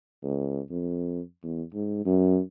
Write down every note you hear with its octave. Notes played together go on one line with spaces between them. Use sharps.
C#2
F2
E2
G#2
F#2